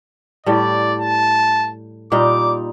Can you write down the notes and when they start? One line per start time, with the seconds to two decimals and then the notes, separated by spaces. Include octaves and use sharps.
0.46 A2 G3 D5
1.01 A5
2.12 A#2 G3 D#4 D6